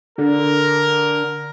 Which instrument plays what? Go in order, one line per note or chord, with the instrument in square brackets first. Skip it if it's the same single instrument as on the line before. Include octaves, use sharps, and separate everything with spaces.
[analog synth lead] D3 [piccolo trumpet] A#4